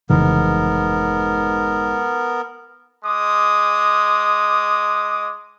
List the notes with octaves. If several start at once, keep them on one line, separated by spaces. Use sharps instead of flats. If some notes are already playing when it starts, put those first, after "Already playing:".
F1 G#2 C#3 E3 B3 A#4
G#3 D6 D#6